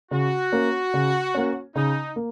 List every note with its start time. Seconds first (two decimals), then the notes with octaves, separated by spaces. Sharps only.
0.11 C#3 F#4
0.52 A#3 C#4
0.94 C#3
1.35 A#3 C#4
1.75 C#3 D#4
2.16 A#3